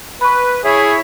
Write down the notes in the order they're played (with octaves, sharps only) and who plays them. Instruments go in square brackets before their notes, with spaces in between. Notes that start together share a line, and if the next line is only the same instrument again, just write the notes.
[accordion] B4 [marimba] B5 C#6
[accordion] E4 C#5 E5 [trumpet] G#4